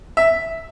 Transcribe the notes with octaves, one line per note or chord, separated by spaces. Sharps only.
E5